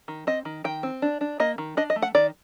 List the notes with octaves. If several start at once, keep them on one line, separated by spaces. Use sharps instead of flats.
D#3
C4 D#5
D#3
D#3 G5
C4
D4
D4
A#3 D#5
D#3
D4 D#5
D#5
A3
F#5
D#3 D5